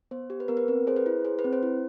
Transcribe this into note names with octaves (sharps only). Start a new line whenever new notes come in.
B3 C5
G4
B4
B3 A#4
B4
C4 A#4
G#4 C5
B4
E4
G#4 C5
B4
C4
C5
E4